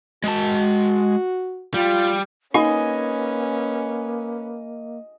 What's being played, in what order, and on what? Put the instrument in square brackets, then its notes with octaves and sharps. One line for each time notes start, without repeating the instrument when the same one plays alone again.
[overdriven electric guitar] G#3 A5 [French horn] F#4
[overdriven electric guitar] G3 [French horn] F4
[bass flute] A#3 [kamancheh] C#4 B4 [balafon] D#4 [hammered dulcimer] D#5 G#5